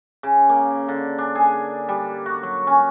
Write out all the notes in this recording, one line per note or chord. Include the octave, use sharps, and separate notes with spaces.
C#3
A#3
D3
D4
G#4
G3
F#4
F#3
C#4